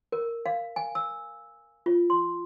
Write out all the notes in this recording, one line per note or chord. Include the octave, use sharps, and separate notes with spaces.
A#4
F5
G#5
E6
F4
C6